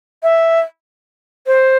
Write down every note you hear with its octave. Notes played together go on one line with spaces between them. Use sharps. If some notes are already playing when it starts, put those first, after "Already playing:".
E5
C5